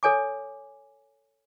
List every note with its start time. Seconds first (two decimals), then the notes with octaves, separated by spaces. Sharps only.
0.03 A4 C#5 G#5 D6